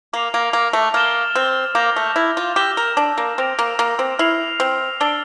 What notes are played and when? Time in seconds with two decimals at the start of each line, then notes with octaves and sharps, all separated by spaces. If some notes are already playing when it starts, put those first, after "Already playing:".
0.13 A#3 D6 F6 C7 F7
0.34 A#3
0.53 A#3
0.73 A3
0.94 A#3 F6 A6 E7 G7
1.35 C4
1.75 A#3 D6 G6 A#6 F7
1.96 A3
2.16 E4
2.37 F4
2.56 G4 E6 A#6 E7
2.77 A#4
2.97 D4
3.18 A#3
3.38 C4 F6 A#6 D7 F7
3.59 A#3
3.79 A#3
3.99 C4
4.19 E4 F6 C7 F7
4.60 C4
5.00 D4 E6 A6 D7 G7